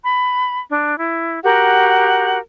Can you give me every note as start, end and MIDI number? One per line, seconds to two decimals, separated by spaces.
0.03 0.60 83
0.70 0.98 62
0.99 1.39 64
1.43 2.38 66
1.43 2.38 67
1.43 2.38 70
1.43 2.38 78